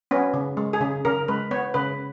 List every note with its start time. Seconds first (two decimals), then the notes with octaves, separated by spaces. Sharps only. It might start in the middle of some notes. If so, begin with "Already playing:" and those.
0.11 B3 C#4
0.34 C#3
0.57 G#3
0.73 G#4
0.81 C#3
1.05 C#3 A#4
1.28 G#3 B4
1.51 B3 C#5
1.74 C#3 B4